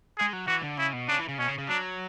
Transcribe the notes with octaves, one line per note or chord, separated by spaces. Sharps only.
G#3 G#4
F#3
E3 F#4
D3
C#3 E4
B2
C#3 D4
E3
C#3
B2 C#4
C#3
C#3
F#3 D4